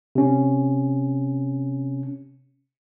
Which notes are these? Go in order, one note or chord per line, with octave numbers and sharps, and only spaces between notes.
C3 C#4